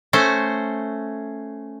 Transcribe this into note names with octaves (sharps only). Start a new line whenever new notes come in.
A3 C#4 C5